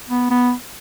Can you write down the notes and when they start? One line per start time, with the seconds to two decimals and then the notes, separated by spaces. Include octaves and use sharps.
0.10 B3
0.30 B3